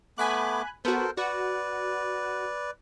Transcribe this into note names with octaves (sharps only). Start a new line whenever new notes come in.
A3 B3 G#5 B5 D6 F#6
B3 F#4 A4 A#4 C5
F#4 B4 D5